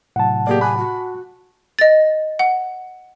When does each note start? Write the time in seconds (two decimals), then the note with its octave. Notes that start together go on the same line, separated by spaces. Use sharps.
0.16 A2 C3 F#3 F#5 A5
0.47 A#3 G4 G#4 D5
0.61 G#5 B5 D6 F#6
0.78 F#4
1.79 D#5 A6
2.39 F#5